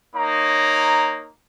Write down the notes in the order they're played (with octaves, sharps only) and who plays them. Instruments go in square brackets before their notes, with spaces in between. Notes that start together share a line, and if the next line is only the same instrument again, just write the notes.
[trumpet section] A#3 D#4 C#5 A#5